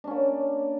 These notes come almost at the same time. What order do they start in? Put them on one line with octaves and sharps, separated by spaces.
D4 C#4 A#3